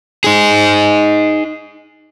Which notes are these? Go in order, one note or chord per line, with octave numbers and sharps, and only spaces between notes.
D#4 G#4